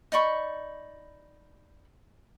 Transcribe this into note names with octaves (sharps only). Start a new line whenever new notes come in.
D#4 D5 B5 C#6